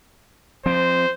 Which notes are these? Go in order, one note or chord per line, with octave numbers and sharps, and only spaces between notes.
F3 C4 C5